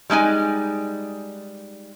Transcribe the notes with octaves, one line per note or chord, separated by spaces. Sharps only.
G3 G#3 D#4 G#5